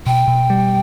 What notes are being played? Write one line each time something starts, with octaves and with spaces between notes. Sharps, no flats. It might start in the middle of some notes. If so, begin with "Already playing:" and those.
B2 G5
B2
G3